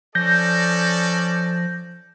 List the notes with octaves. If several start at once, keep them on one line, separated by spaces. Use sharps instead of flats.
F3 C#4 A4 D5 G6 A#6